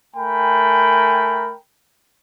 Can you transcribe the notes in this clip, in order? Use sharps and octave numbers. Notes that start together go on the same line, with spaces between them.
A3 A#4 G5 G#5 B5